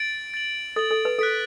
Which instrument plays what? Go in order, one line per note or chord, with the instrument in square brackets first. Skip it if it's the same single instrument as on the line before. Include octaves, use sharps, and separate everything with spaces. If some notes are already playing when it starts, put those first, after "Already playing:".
Already playing: [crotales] A6 D7 F#7
A6 F#7
[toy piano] A4 [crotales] A6 F#7
[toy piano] A4
B4
[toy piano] A4 [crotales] F#6 B6 D7